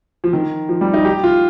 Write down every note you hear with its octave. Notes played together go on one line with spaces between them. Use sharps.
F3
D#3
F3
G3
D#4
G4
F4